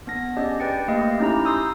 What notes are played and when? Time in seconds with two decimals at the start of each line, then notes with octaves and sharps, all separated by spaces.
0.07 B3 D4 A#6
0.37 C#4 D4 G4 G#4 D5 D#5
0.60 B4 D5 G5 A6 C#7
0.88 A3 A#3 G4 D#5 F5
1.20 C#4 D#4 E4 G4 A#5
1.44 C6 D#6 E6 G6